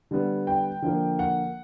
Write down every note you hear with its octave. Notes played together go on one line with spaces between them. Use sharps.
D3 G3 B3
G5
D3 F3 A#3
F#5